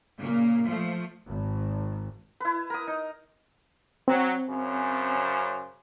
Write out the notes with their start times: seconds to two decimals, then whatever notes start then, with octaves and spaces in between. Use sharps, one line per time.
0.18 A#2 C#3 A#3
0.64 F3 A3
1.28 G#1
2.40 E4 B4
2.70 A#4 D#6
2.87 D#4
4.08 F#3 C4
4.49 F#2 C#3 C5